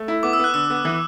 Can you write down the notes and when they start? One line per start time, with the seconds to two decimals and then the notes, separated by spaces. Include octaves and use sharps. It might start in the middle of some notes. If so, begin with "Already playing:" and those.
Already playing: A3
0.08 E4
0.23 B3 D6
0.33 E6
0.39 B3 F#6
0.54 D3 E6
0.70 B3
0.85 E3